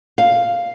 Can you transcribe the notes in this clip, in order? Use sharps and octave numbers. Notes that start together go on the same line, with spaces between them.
F5